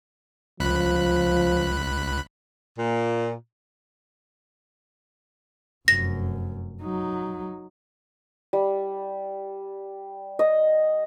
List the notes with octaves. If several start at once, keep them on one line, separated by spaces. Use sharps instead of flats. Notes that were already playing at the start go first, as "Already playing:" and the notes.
C#2 F3 B5 F#6
A#2
F1 F#2 A#6
F#3 D#4
G3
D#5